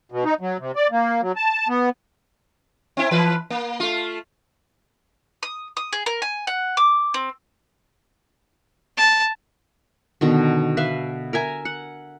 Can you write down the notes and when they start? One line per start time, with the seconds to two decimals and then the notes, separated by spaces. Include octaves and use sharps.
0.12 B2
0.25 D#4
0.41 F#3
0.60 C3
0.76 D5
0.91 A#3
1.22 F#3
1.36 A5
1.68 B3
2.97 C4 E4
3.11 E3 B4
3.50 A#3
3.80 A3 F4
5.43 D#6
5.77 D#6
5.93 G#4
6.06 A#4
6.22 G#5
6.47 F#5
6.77 D6
7.14 C4
8.97 A5
10.21 B2 D3 D#3
10.77 B4 E5 F5
11.33 A#4 E5 G#5 A#5
11.65 F#5